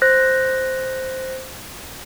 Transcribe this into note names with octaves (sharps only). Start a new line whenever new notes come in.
C5 F#6 A#6